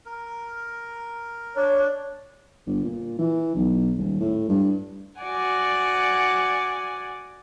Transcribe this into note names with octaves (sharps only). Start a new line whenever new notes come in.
A#4
D4 C#5
G1
A#2
E3
B1
D#1
A2
G2
F#4 D5 F#5 G#5